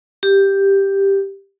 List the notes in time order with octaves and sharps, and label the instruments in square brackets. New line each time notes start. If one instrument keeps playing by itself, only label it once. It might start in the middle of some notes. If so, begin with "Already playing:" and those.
[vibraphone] G4